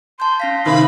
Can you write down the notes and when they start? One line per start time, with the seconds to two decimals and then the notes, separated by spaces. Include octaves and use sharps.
0.20 A5 C6 G6
0.40 C#4 F5 A#6 B6
0.66 C3 D#3 C5 E5 B5